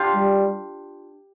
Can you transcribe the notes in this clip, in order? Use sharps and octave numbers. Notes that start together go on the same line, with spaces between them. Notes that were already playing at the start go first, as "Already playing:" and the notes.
Already playing: D4 F4 G4
G3